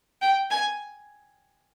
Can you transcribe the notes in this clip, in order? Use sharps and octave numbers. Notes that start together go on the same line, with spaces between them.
G5
G#5